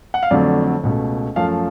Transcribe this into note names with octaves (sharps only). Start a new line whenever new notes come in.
F#5
F5
F2 D3 F#3 A3 D5
C#2 B2 A3
F#2 F3 A3 F5